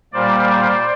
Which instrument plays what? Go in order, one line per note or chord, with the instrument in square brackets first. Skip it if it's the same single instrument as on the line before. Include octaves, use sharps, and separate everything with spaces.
[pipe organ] A#2 G3 A#3 C5 D5